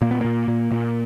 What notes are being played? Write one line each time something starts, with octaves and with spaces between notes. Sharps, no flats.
A#2 A#3
B3
A#2 A#3
A#2
A#2